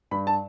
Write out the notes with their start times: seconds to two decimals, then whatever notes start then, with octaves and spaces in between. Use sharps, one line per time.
0.11 G2 B5
0.27 A5